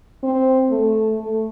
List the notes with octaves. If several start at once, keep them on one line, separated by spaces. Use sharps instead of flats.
C4
A3
A3